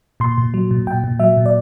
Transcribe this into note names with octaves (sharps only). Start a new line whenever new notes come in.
A#2 C6
A#2
F#3
A#2
A#2 G5
A#2
F#3 E5
A#2
D5